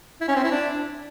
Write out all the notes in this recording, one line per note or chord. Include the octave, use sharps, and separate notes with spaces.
E4
C#4
C4
E4
D4